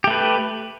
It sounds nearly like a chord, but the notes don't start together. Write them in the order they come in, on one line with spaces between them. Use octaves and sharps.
G4 A3 B4